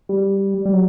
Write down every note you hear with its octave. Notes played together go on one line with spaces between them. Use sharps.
G3
G3
F#3